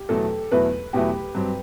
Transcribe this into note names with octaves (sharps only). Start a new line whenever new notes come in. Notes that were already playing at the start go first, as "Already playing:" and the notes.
Already playing: G4
E2 B2 F#3 A3 E4 A4
E2 B2 F#3 A3 E4 B4
E2 B2 F#3 A3 E4 G4
G2 F#3 C4